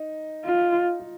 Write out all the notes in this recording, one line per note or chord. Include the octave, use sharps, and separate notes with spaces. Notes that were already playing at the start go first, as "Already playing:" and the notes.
Already playing: D#4
F4
F4